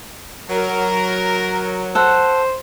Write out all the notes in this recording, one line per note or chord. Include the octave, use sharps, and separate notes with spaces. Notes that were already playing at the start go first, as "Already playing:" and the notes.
F#3 A#4
A4 C5 F#5